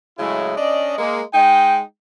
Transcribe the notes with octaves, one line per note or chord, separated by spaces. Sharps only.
A2 C#3 F#3 G#3 E4
C#4 D4 D5 D#5
G#3 A#3
G#3 D#4 G5